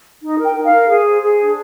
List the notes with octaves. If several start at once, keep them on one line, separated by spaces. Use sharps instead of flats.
D#4
A#4
G5
D#4
F5
A#4
G#4
C5
G#4
D4